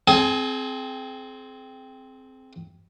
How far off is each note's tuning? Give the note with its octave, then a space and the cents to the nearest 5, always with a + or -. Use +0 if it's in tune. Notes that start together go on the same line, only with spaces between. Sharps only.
C4 +0 G#4 +35 G#5 +0